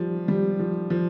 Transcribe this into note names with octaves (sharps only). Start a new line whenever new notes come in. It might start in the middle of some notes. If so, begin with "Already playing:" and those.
Already playing: F3 G3
G3
F3
F3